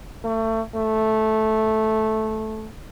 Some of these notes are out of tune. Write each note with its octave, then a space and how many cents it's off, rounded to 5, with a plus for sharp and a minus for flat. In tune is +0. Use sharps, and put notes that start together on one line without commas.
A3 +30
A3 -10